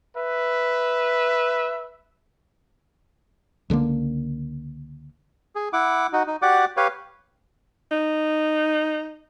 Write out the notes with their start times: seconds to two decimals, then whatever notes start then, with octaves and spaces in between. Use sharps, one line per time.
0.16 B4 E5
3.70 C#2 D3 F#3 A#3
5.55 G#4
5.73 E4 F#5 D6
6.13 D#4 F#4
6.27 D#4
6.42 F#4 G4 D5 F#5 D6
6.77 G4 B4 C#5 F5
7.91 D#4